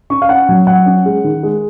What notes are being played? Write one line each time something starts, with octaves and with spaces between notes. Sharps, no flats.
C#4 C#6
F5
C#4 F#5
F#3
F#3 F#5
C#4
G#3
D#3
G#3